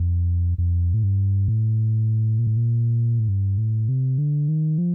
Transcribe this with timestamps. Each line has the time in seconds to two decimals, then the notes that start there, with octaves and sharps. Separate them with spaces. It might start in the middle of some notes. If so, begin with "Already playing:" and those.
Already playing: F2
0.58 F2
0.94 A2
1.03 G2
1.48 A2
2.39 A#2
2.47 A2
2.57 A#2
3.19 A2
3.28 G2
3.58 A2
3.89 C3
4.18 D3
4.48 D#3
4.78 F3